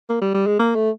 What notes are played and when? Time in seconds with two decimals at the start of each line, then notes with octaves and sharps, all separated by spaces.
0.09 A#3
0.21 G3
0.34 G3
0.46 G#3
0.59 A#3
0.75 A3